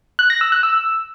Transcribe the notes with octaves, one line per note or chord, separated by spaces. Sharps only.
F#6
A#6
E6
F#6
E6